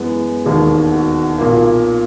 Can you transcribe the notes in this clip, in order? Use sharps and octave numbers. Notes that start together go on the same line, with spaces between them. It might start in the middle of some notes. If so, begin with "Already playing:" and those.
Already playing: F#2 E3 G#3 B3
E1 D#2 D#3 G#4
F#4
B1 A#2 A#3